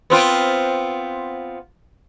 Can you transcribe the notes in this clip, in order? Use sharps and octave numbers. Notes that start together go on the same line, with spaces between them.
B3 C4 F4